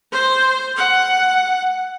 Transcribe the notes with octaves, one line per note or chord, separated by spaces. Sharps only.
C5
F#5